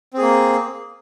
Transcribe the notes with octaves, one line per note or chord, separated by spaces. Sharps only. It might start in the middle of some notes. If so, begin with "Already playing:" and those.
A#3 C4 G#4